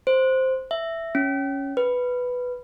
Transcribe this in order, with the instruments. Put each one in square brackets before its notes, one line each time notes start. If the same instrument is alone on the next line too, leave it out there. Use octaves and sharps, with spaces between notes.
[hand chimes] C5
E5
C#4
B4